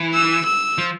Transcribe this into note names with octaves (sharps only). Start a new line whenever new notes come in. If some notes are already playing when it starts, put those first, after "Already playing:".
Already playing: E3
E6
E6
F3